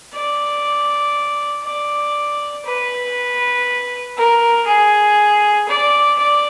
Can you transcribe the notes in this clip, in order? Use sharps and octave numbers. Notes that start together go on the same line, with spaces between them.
D5
D5
B4
A#4
G#4
D5
D5